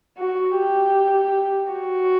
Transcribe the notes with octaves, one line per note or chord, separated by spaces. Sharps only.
F#4
G4
F#4